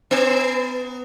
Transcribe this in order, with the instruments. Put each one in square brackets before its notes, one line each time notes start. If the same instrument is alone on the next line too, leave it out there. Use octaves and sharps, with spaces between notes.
[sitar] B3